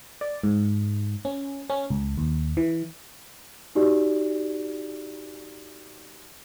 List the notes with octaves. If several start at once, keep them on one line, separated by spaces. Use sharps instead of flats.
D5
G#2
C#4
C#4
C#2
D#2
E3
D#4 F#4 G4 D5